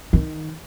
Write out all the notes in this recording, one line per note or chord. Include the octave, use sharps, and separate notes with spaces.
D#3